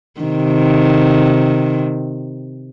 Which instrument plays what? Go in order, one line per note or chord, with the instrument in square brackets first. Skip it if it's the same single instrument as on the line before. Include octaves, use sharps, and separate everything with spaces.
[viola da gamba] C3 D#3